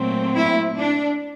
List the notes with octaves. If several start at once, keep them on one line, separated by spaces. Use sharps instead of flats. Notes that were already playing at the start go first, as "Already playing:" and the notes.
Already playing: A#2 F#3 A3 C4
E4
D4